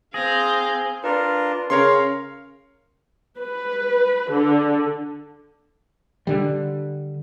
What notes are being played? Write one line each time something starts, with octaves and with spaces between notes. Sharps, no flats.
C4 G#4 F5 G6 A#6
D4 F4 A#4 B4
C#3 A#4 C#5 F5 C6
B4
D3
D3 G3